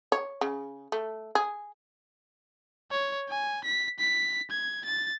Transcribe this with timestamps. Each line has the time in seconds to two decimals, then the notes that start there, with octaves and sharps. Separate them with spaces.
0.12 C#5
0.41 C#3
0.92 A3
1.35 G#4
2.90 C#5
3.29 G#5
3.64 B6
3.99 B6
4.51 G#6
4.85 A6